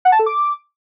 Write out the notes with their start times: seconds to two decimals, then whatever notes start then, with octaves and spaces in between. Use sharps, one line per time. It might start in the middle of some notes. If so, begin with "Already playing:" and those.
0.05 F#5
0.12 A5
0.19 A4
0.26 D6